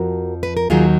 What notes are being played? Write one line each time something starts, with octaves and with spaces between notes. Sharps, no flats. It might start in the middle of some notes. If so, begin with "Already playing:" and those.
Already playing: F2 F3 F#4 A#4
B4
A#4
D#2 D#3 F#3 F4 G#4